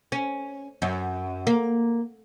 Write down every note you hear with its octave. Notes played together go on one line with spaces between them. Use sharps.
C#4
F#2
A#3